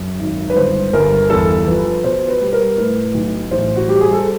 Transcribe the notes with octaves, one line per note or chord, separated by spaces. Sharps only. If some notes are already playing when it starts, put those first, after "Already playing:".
Already playing: F#2
G#1
B4
G1 C5
G1 A#4
E2 A4
F3 B4
B2 C5
B4
G3
A#4
A2 B4
B1
A1 C5
F#4
G3 G4
G#4
A4